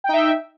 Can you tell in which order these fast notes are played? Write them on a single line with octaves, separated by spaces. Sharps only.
G5 D#4 E5